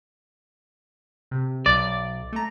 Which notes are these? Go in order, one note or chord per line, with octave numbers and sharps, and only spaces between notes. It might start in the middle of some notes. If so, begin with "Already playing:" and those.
C3
B1 D5
A3 A#5